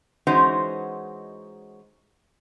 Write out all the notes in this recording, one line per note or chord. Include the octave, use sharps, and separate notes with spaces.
E3 G#3 C#4 D#4 F#4 C5